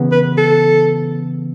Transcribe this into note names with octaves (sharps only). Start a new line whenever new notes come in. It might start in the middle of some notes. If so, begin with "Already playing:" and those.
Already playing: C#3 E3 B3
B4
A4